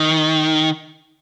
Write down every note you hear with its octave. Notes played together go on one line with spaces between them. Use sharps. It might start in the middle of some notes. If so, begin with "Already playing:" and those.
Already playing: D#3